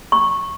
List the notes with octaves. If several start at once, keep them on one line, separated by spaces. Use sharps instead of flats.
C#6